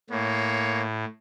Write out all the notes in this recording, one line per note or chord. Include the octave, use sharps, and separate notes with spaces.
A2 A#3 C#5